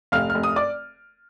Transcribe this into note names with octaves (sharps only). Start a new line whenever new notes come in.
F1 F5 F6
F1 F6
D#6
D5 D6